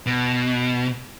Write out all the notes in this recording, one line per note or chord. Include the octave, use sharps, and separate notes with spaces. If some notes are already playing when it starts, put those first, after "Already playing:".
B2